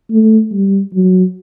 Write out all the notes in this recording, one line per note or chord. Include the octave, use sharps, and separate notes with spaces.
A3
G3
F#3